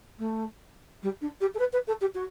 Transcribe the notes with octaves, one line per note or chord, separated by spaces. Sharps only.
A3
G3
D4
G4
A4
B4
B4
A4
G4
F#4